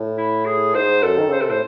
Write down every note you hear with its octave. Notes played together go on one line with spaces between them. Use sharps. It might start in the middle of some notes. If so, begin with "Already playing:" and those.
Already playing: A2
E4
G#4
G#2 C5
F#2 A4
D#3
C#3 C5
C3 A4
A2 C5